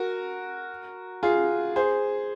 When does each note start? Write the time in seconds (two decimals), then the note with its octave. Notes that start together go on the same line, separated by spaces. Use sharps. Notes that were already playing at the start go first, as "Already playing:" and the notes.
Already playing: F#4 A#4
1.23 F4 G#4
1.76 G#4 C5